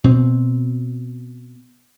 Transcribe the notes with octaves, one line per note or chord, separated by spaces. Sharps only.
B2 C4